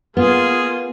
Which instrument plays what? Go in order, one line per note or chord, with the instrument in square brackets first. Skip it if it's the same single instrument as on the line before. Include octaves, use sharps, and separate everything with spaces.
[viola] A#3 F4 [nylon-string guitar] B3 [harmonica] G#4